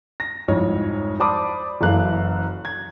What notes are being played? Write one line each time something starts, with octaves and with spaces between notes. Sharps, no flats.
A#6
C2 F2 G#2 C#5
C5 D5 A5 B5 D6 D#6
F#1 F#2 E3 A4 F5 F#6
G#6